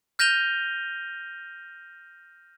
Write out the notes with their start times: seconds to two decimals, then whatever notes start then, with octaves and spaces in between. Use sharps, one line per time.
0.19 F6 G6 A#6 D#7 F7 G7